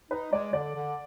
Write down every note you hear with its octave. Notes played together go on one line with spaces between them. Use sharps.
D#4 B4
G#3 D5
D3 D5
D3